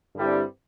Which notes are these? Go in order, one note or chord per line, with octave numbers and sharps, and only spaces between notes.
G2 D3 G3 C4 E4